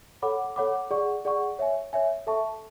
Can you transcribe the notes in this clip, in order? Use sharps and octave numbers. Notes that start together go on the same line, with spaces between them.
A4 C#5 F#5 B5 D6
A4 C#5 F#5 B5 D6
G#4 D5 F#5 C#6
G#4 D5 F#5 C#6
C#5 E5 G#5
C#5 E5 G#5
A4 E5 A5 C#6